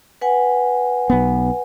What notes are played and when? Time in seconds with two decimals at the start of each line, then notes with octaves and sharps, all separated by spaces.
0.21 B4 F#5 G#5
1.10 B1 B3